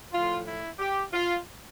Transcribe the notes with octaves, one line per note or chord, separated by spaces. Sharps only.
A2 F3 F4
E4
G4
F4